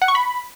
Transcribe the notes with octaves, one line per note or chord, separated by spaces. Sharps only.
F#5
C#6
B5